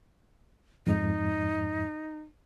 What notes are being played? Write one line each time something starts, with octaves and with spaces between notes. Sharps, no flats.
F2 G#2 D#4